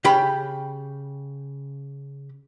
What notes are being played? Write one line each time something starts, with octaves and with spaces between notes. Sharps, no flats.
C#3 G4 B5